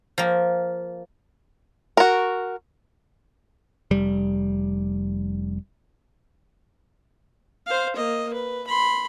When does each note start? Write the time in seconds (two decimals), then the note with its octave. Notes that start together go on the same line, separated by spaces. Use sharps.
0.18 F3 A#3
1.97 F#4 A#4
3.91 F1 G3
7.67 C5 F5
7.96 A#3 D#5
8.34 B4
8.68 B5 C6